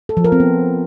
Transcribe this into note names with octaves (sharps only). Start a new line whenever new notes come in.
A4
F3
A#4
C4
B3